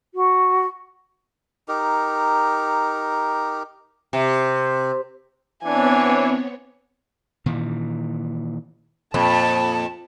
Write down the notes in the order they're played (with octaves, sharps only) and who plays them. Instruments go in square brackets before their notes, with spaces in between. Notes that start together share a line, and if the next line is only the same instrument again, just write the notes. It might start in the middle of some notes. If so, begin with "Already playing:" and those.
[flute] F#4
[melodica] D#4 G4 A#4
[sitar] C3
[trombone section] E3 D4 [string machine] B3 C4 C#5 [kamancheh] G#5
[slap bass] A#2 D#3 E3
[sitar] F2 [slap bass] A#2 [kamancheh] A5